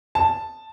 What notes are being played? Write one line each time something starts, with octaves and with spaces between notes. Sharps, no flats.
A5